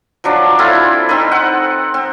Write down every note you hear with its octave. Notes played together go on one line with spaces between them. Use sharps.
F3 F#3 D4
C4 E4 F4 A4
C4 D#4 B4
F#5
C4